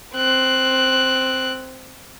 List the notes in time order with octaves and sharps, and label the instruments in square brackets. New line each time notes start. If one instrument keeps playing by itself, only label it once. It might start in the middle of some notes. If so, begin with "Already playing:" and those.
[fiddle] C4 F#6